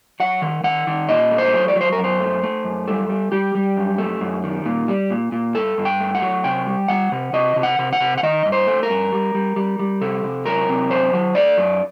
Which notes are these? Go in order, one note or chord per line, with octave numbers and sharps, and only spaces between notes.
F#3 F#5
D#3
D#3 F#5
D#3
A#2 D#5
A3
C5
F#3
D5
F#3
C5
A#4
F#2
C5
A3
A3
F#2
G3 A4
G3
G3 G4
G3
F#2
A3
F#2
D#3
A#2
G3
A#2
A#2
G2 A4
G2
G5
A3
F#5
F#3
C3 G5
G3
G3 F#5
C3
C3 D#5
C3
F#5
C3
F#5
C3
F#5
D#3 D#5
G2
C5
A3
A#4
G2
G3
G3
G3
G3
C3 A4
C3
F#3 A#4
C3
F#2 C5
F#3
A3 D5
F#2